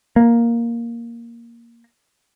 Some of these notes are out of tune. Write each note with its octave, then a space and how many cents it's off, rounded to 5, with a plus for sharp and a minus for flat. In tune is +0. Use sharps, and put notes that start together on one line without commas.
A#3 +5